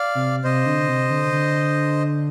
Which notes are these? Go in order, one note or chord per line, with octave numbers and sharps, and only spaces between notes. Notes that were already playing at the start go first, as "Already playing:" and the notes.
Already playing: D5 F5
C3
C3 C5 D#5
D3
C3
D3
D3